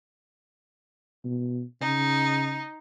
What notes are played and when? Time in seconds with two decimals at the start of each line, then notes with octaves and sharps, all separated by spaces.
1.25 B2
1.81 C#3 D#4